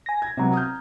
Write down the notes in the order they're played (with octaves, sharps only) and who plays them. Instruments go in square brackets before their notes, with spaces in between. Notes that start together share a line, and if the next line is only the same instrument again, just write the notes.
[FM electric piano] G#5 A#6
[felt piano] G#6
[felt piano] C3 F#3 B3 [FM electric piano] C4 A#5
[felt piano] D#6 F6 G6